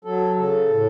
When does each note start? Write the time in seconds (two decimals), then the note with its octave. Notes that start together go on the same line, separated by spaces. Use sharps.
0.05 F#3 A4
0.36 C#3 A4
0.68 A2